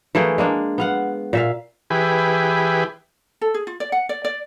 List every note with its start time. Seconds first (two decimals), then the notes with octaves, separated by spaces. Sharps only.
0.15 E3 A3 A#3 G#4
0.38 G#3 A#3 D4
0.78 B3 F5 F#5
1.33 A#2 E5 F5
1.90 E3 G4 G#4 B4
3.41 A4
3.54 G#4
3.67 F4
3.80 D5
3.92 F#5
4.09 D5
4.25 D5